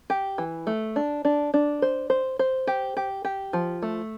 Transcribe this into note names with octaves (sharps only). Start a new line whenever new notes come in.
G4
E3
A3
D4
D4
D4
C5
C5
C5
G4
G4
G4
F3
A3